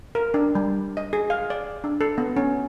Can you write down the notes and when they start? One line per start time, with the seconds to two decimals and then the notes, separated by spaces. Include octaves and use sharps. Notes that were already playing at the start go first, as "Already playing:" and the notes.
0.15 A#4
0.34 D4
0.55 G3
0.97 D#5
1.13 G#4
1.30 F5
1.50 D5
1.84 D4
2.01 A4
2.18 B3
2.37 C#4